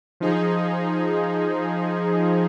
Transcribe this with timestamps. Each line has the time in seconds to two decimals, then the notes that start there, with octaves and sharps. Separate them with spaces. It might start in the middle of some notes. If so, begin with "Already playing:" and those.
0.20 F3 D#4 G#4